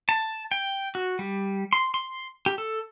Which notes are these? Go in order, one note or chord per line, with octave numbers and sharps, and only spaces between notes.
A5
G5
F#4
G3
C6
C6
G4
A4